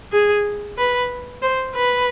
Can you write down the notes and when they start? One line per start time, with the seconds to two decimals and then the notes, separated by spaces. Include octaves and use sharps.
0.12 G#4
0.78 B4
1.42 C5
1.75 B4